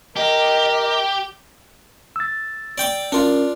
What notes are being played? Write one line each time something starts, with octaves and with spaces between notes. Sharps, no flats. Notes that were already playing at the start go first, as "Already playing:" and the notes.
G4 A#4 D#5
E6 A6
D5 G5 D6
C#4 D4 F4 A#4